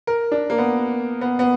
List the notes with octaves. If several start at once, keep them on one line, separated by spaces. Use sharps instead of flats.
A#4
D4
A#3
B3
B3
B3